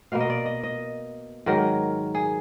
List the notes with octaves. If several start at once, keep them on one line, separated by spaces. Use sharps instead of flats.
B2 A#3 F5
D#5
D5
D#5
D#5
G#2 D#3 F#3 A#4
G#4